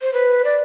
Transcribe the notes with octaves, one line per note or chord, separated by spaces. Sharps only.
C5
B4
D5